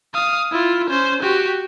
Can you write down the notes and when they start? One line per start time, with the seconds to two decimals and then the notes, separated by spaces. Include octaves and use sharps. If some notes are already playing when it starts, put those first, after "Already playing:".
0.14 F5 D#6
0.51 E4 F4
0.90 C#4 C5
1.22 F#4 G4